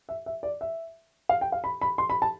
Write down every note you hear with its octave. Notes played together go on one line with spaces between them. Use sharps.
E5
E5
D5
E5
F5
G5
F5
B5
B5
C6
B5
A5